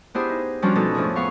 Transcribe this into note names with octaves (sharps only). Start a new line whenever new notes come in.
B3 D4 E4 G4 G#4 C5
D#4
F3 G3 C#4 D4 F4 F#4
G#2 B2 B3 D#4 A4
F2 A2 F3 D4 G#4
B3 G#4 F5 C#6